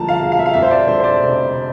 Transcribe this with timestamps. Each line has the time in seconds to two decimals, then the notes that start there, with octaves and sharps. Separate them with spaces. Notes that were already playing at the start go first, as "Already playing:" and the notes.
Already playing: D2 D3 F3 A5 A#5
0.08 F5
0.20 E1
0.32 F5
0.39 E5
0.46 F5
0.54 F2 E5
0.62 C5
0.71 D5
0.87 D3 C5
1.00 C5
1.04 D5
1.21 F1